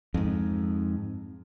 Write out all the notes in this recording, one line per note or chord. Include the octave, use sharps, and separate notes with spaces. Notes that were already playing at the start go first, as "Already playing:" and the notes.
F2 G#2